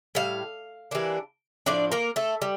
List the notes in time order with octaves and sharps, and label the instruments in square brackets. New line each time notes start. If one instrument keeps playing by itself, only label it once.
[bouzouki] A2 G3 F5
E3 G3 A#3 D4
A2 F3 A3 D4 D5
A#3 A#4
A3 A4
G3